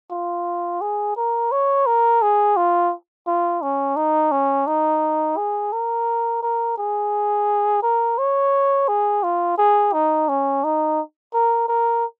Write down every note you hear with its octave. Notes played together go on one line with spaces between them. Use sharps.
F4
G#4
A#4
C#5
A#4
G#4
F4
F4
C#4
D#4
C#4
D#4
G#4
A#4
A#4
G#4
A#4
C#5
G#4
F4
G#4
D#4
C#4
D#4
A#4
A#4